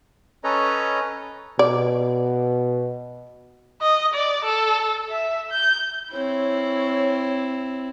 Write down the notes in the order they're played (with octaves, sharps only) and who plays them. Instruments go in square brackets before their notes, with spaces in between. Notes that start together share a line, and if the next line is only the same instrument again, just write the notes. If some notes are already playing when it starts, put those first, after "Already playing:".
[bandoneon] C#4 A4 B4 C#5 D#5 A#5
[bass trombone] B2 [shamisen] D5
[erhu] D#5
D5
A4
E5
G6
[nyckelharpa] C4 E4 [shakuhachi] C#5